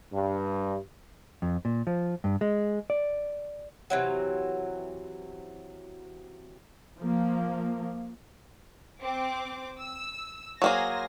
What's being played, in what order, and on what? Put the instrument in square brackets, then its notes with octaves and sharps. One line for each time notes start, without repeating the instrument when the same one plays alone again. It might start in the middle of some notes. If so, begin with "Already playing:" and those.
[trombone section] G2
[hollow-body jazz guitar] F2
A#2
F3
G2
G#3
D5
[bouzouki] C3 E3 F#3
[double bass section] F3 A#3
[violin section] C4 D6
E6
[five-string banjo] F#3 A#3 G#4 [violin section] C5 G#5 A#6